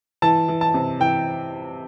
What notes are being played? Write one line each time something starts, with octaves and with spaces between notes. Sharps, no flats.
E3 A5
E3
A5
C3
E3 G5